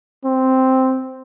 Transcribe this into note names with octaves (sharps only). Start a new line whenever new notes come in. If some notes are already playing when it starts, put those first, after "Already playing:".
C4